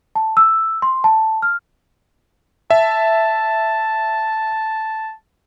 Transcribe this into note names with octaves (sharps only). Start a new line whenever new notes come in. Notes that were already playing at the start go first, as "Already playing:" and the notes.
A5
E6
C6
A5
F6
E5 A5